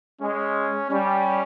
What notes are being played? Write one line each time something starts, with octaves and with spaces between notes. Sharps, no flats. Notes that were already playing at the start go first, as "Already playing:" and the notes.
G#3 C#4
G3 C#4